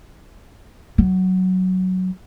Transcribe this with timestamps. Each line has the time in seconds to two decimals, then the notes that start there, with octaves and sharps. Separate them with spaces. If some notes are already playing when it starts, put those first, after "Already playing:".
0.98 F#3